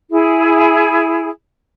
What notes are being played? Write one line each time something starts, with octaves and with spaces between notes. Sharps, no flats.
E4 G#4